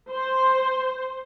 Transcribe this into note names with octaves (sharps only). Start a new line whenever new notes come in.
C5